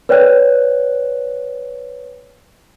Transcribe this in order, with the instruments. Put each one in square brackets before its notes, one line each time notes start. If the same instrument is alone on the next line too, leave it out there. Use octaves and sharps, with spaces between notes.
[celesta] B4 C#5 D5 G5 F#6